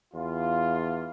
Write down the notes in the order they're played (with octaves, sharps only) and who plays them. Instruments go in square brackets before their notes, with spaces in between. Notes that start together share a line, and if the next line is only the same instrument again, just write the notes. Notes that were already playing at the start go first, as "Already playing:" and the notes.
[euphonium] E2 [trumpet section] F4